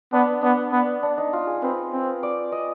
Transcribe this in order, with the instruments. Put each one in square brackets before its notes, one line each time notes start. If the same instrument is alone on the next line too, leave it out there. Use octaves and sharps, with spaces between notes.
[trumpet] B3 [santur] D4
[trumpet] B3 [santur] D4
[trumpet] B3
[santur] D4
D#4
F4
G#4
[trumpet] C4 [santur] B4
[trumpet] C4
[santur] D5
D#5